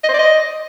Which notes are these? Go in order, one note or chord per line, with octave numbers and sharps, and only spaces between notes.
D#5
C5
D5
D#5